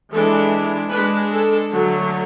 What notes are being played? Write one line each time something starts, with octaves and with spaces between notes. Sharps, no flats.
E3 G#3 D4 A4
G#3 D4 B4
A4
D3 F#3 A3